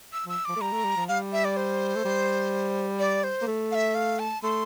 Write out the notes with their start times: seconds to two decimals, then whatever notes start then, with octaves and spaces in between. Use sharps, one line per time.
0.13 E6
0.26 F3 E6
0.45 F3 D6
0.56 A3
0.61 G3 A#5
0.72 A3
0.84 G3
0.97 F3
1.08 G3 F5
1.32 E5
1.45 D5
1.57 C5
1.96 A3
2.05 G3
2.99 D5
3.24 C5
3.42 A#3
3.47 A3
3.71 F5
3.75 E5
3.95 F5
4.19 A5
4.43 A3 C6